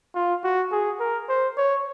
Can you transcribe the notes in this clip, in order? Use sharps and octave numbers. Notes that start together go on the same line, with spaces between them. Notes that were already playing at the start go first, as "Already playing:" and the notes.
F4
F#4
G#4
A#4
C5
C#5